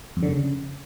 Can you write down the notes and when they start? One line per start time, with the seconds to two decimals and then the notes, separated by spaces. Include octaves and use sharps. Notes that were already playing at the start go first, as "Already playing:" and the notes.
0.17 F2
0.23 D3
0.28 C#3